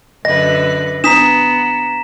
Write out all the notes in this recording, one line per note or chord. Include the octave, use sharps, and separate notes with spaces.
F#2 D3 B4 D#5 A#6
B3 D4 A#5 D#6 B6 E7